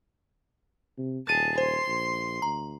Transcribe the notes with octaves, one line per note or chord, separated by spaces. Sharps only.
C3
D#1 G#4 A5 A6 D#7
C5 C6
A#1
D2 A#5